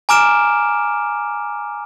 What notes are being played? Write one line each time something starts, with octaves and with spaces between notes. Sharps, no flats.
G#5 A#5 D6 F6 D7 E7